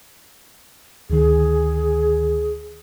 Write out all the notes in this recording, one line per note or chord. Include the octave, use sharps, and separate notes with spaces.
D2 D#3 G#4